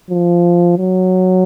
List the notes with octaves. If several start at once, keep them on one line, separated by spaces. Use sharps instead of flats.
F3
F#3